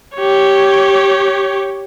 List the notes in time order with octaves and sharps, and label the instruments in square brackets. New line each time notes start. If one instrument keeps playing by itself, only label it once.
[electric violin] G4 C#5